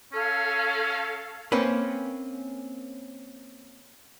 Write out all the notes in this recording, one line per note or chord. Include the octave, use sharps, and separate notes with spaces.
C#4 A4 F5
A#3 C4 C#4 B4